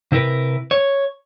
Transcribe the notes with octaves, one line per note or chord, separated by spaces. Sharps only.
C3 E4 A#4 B4
C#5